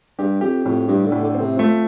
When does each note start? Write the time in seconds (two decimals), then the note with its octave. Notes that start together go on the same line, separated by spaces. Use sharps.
0.18 G2 G4
0.41 F2 G4
0.65 F2 A2
0.88 G2 G4
1.06 D3
1.12 A2
1.24 D3
1.35 C4
1.40 C3
1.58 F3 A3